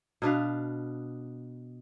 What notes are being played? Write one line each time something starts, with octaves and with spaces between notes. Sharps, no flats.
B2 D4 B4 F5